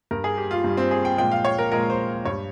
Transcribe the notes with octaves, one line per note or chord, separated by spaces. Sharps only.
G2 G3 A#4
G#4
G4
F4
G2 G3
C4
G#4
G5
A#2 F3 G#3 G5
F5
C#5
A#4
A#2 F3 G#3 A#4
C5
G2 G3 C#5